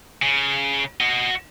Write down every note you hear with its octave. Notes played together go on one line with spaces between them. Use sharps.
C#3
F#4 D#5